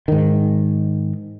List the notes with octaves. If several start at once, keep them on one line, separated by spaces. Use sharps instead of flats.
G#2 D#3